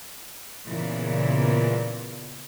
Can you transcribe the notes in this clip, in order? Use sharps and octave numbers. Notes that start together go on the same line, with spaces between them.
A#2 C#3 E3 B3